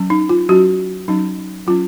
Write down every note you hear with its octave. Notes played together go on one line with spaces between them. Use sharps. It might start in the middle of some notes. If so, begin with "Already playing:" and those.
Already playing: F#3 C#4
D#4
F4
F#3 C#4 F#4
F#3 C#4 D#4
F#3 C#4 F4